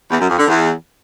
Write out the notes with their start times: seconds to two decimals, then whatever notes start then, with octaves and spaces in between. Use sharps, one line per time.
0.10 E2
0.19 F#2
0.29 F2
0.38 D3
0.47 E2